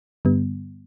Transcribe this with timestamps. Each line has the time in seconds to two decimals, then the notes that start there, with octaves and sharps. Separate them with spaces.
0.25 G2 D3 G3 B3